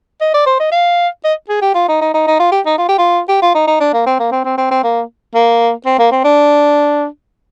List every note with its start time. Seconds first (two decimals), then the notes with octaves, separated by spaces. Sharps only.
0.21 D#5
0.34 D5
0.46 C5
0.60 D#5
0.72 F5
1.24 D#5
1.49 G#4
1.62 G4
1.75 F4
1.89 D#4
2.01 D#4
2.14 D#4
2.27 D#4
2.40 F4
2.52 G4
2.66 D#4
2.78 F4
2.89 G4
2.98 F4
3.29 G4
3.42 F4
3.55 D#4
3.67 D#4
3.81 D4
3.93 A#3
4.06 C4
4.19 A#3
4.32 C4
4.45 C4
4.58 C4
4.71 C4
4.84 A#3
5.35 A#3
5.86 C4
5.99 A#3
6.12 C4
6.24 D4